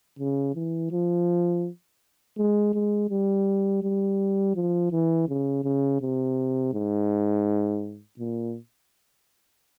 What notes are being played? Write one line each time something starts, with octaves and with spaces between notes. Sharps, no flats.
C#3
E3
F3
G#3
G#3
G3
G3
F3
E3
C#3
C#3
C3
G#2
A#2